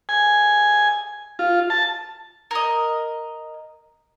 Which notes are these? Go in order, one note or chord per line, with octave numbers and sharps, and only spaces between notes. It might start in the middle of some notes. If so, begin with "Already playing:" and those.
G#5
F4
A5
A#4 D#5